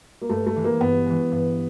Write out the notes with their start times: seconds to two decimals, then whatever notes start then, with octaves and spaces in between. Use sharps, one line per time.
0.22 A#3
0.29 G2 A3
0.46 A3
0.56 E3 G#3
0.64 A#3
0.81 G2 B3
1.06 E3 G#3
1.32 G2